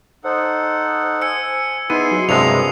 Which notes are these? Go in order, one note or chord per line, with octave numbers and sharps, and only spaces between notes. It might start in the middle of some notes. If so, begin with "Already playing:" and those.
D#4 A4 C5 F#5
G#5 E6 C#7
B3 D#4 E4 G#4 C6 D#7
F#3
G2 C3 G#3 A#3 B3 C7 F7